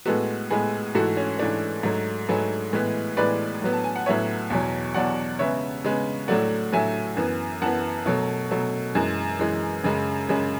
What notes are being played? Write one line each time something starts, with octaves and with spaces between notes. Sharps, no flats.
A2 G#3 B3 F#4 A4
A2 G#3 B3 G#4 B4
G#2 E3 A3 F#4 A4
C#4
G#2 E3 A3 D4
G#2 F#3 A3
G#2 F#3 A3 G#4 B4
A2 E3 G#3 B3
A2 E3 G#3 B3 B4 D5
A2 F#3 B3
A5
G#5
F#5
A2 F#3 B3 C#5 E5
E2 B2 F#3
E2 B2 F#3 D5 F#5
C#3 G#3 B3 C#5 E5
C#3 G#3 B3
A2 F#3 A3 D5 F#5
A2 F#3 A3 E5 G#5
F#2 E3 B3
F#2 E3 B3 F#5 A5
B2 F#3 A3
B2 F#3 A3
F#2 E3 G#3
F#2 E3 G#3
F#2 C#3 G#3
F#2 C#3 G#3